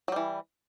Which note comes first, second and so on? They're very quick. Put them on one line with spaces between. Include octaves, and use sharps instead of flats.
F#3 G3 E3